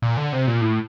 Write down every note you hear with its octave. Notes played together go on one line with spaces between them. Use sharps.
A#2
D3
C3
A#2
A2